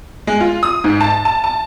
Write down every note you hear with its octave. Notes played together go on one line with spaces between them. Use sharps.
G#3
F4
D#6
G#2
A5
A5
A5